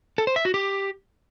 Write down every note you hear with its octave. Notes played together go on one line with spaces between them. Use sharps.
A4
C5
E5
F#4
G4